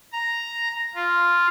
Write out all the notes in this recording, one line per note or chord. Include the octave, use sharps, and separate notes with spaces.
A#5
F4